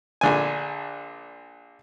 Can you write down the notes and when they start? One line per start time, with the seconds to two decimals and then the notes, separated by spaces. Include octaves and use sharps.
0.21 A#1 D3 G#5